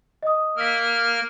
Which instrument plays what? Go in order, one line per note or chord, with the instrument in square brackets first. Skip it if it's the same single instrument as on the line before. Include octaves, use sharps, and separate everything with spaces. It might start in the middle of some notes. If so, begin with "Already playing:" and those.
[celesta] D#5 D#6
[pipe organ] A#3 A#4 F6 [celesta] E6 B6